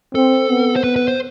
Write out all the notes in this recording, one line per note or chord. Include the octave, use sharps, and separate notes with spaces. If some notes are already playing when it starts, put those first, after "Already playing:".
C4 A4
B3
C5
B3 B4
B4
C5